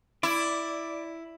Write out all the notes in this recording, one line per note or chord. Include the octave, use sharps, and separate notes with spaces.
E4 D5